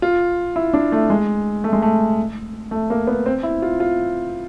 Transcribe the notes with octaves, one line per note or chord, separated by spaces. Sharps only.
F4
E4
D4
A3
G#3
A3
G#3
A3
A3
A#3
B3
C4
E4
F4
F4